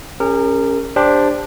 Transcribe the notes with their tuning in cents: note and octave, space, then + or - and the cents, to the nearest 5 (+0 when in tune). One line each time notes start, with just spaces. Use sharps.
C#4 +0 G4 +45 A#4 -20
D4 +0 G4 +20 C5 +0